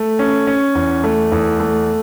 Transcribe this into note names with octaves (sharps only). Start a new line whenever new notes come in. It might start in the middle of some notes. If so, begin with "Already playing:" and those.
Already playing: A3
C#4
C#4
E2
A3
E2
A3